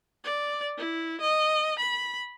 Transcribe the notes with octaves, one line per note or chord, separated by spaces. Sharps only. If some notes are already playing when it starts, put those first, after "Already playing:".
D5
E4
D#5
B5